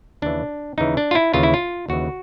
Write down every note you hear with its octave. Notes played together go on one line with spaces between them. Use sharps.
D#2 C#3 E3 D4
D#2 C#3 E3 D#4
D4
F4
E4
D#2 C#3 E3 F4
E4
F4
D#2 C#3 E3 F#4